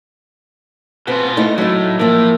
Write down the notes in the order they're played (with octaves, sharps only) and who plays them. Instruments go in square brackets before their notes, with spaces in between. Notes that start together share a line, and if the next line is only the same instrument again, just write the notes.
[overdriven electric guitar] B2 F4 [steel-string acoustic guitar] B3 C4 B4
[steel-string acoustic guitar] A3 D#4 E4
[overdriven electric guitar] A2 [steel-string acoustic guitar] F#3 D#4
[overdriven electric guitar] A2 [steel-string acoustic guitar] F3 A#3